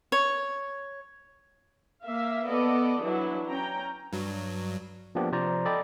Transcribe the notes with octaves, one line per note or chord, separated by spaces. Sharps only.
C#5
A#3 E5 F5
B3 A4 D5 D#5
E3 F#3 D4 E4
C#4 G5 A#5
G2 F#3
F3 A#3 B3 D4 G4
C3 F3 C5 D5 A#5
A4 D5 D#5 G5 B5